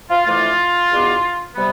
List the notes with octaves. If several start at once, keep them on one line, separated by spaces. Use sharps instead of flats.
F4
F2 E3 A3 D4 F4
E2 B2 B3 D4
C3 G3 B3